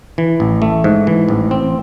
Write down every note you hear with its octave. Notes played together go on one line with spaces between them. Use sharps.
E3
A1
A3
G#2
E3
A1
C4